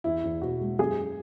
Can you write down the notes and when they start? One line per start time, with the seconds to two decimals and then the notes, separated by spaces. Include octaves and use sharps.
0.04 E2 E4
0.24 E2
0.41 B2 F#4
0.61 G#3
0.79 F#2 G#4